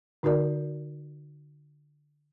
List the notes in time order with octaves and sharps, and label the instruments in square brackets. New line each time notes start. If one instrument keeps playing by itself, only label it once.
[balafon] D3 D#4 F#4 A#4 D5